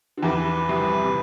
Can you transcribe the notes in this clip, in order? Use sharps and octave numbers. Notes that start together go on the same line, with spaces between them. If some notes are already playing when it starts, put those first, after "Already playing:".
D3
E2 E3 G4 B4
C2 C3
C3